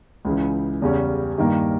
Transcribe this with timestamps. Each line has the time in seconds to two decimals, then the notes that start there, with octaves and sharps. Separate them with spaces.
0.25 C#2 C#3 E3
0.82 E2 C#3 G3 C#4
1.38 G2 D#3 A#3